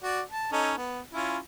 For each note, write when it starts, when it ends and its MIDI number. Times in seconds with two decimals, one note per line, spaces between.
0.03 0.22 66
0.03 0.22 74
0.31 0.52 81
0.53 0.74 61
0.53 0.74 63
0.53 0.74 69
0.77 1.01 59
1.13 1.38 61
1.13 1.38 64
1.13 1.38 65